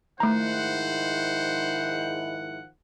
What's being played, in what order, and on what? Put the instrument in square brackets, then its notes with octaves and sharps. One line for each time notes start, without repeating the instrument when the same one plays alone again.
[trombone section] G#2 E4 [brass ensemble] D#3 F3 F#5 [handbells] A3 A#5 [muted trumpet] C5